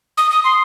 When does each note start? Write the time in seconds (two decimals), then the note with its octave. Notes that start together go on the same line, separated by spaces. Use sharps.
0.17 D#6
0.31 D#6
0.44 C6